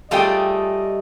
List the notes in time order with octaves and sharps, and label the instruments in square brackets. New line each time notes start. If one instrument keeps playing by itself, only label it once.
[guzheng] G3 A3 [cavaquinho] F4 G#4 G5 [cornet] D#5